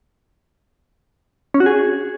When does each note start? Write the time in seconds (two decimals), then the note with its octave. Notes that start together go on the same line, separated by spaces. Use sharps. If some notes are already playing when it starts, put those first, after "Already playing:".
1.54 C#4
1.60 F#4
1.66 G#4